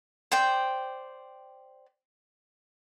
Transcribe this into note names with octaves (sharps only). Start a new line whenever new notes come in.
C5 D5 G5